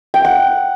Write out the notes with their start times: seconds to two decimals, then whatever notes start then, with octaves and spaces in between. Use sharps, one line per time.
0.14 G5
0.25 F#5